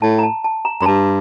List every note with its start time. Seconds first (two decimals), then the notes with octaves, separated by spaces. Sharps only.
0.02 A2 A5
0.19 A#5
0.23 A5
0.44 A5
0.65 A#5
0.80 F#2 A#5
0.86 G2 A5